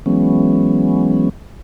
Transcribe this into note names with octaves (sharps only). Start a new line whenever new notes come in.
E3 F#3 G#3 B3 C#4